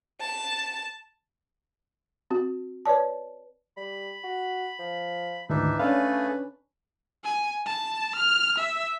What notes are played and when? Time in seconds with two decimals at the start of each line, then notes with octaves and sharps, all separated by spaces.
0.21 A5
2.30 C4 F#4
2.85 B4 C#5 D5 A5
3.77 G3 B5
4.24 F#4
4.79 F3
5.49 D2 G#2 D#3 E3 D4 D#4 E5
5.79 A3 C#4 D4 G#4 A4 B4 F5
7.24 G#5
7.66 A5
8.16 F6
8.58 E5